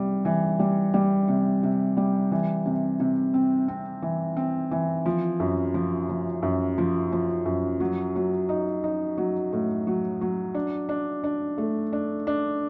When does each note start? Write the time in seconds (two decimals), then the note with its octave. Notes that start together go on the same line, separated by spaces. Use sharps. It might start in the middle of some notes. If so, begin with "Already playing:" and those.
Already playing: C3 G3
0.25 E3
0.59 G3
0.94 G3
1.28 C3
1.63 C3
1.97 G3
2.32 E3
2.66 C3
3.00 C3
3.34 C4
3.68 C4
4.02 E3
4.37 C4
4.71 E3
5.06 F3
5.40 F#2
5.74 F3
6.09 F3
6.43 F#2
6.78 F3
7.12 F3
7.45 F#2
7.80 F#3
8.15 F#3
8.49 D#4
8.84 D#4
9.17 F#3
9.53 A2
9.87 F#3
10.21 F#3
10.54 D4
10.89 D4
11.24 D4
11.58 A3
11.93 D4
12.27 D4